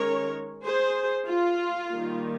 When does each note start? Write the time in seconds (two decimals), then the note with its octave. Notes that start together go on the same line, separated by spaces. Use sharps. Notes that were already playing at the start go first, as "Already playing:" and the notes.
Already playing: D#3 G#3 C#4 A#4 C#5
0.64 G#4 C5
1.27 F4
1.90 D#3 G3 A#3